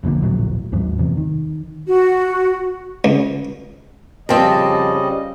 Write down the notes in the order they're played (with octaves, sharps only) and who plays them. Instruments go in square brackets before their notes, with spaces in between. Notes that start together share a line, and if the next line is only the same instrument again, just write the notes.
[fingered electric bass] E1 A#1 A#2 D3
D#1 A#1 A2 F#3
D#2 G#2 F#3
E2 C3
D#3
[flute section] F#4
[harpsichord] C#2
[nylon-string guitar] F2 C4 [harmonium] C#3 G3 D#5